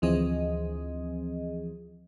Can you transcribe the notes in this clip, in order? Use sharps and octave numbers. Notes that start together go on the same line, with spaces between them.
D2 E3 F3 C4 G#4 D#5